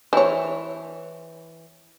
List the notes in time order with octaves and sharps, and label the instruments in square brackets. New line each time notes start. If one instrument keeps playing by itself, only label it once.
[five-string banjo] E3 [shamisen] C5 C#5